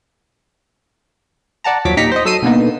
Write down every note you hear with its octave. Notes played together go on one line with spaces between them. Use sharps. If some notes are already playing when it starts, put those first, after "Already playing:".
D5 F#5 A5 A#5
D#2 F3 F#3 C#5 D6 B6
A#2 D#4 G4 A#5 B6 C#7
C5 D#5
F#3 A4 E6 C7 D#7
B2 D3 A#3 B3 D#4